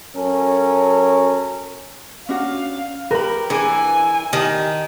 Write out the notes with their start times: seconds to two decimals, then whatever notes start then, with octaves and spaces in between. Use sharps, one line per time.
0.16 F#3 C#4 A4 A#4
2.29 C#4 D4 F#4 F5
3.11 G4 A#4 B4 B5
3.50 E3 D4 G#4 B4 G#5
4.33 D#3 G4 A5